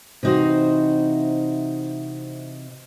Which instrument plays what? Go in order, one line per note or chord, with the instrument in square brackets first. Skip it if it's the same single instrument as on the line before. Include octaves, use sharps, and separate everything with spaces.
[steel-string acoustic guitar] C3 E3 D#4 F#4 C5